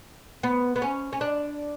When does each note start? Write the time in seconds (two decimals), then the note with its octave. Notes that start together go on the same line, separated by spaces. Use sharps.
0.43 B3
0.76 B3
0.82 C#4
1.13 C#4
1.21 D4